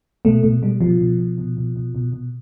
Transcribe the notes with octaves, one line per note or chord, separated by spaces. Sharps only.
B2 A3
B2 A3
B2 G3
B2 F3
B2
B2
B2
B2
B2
B2
B2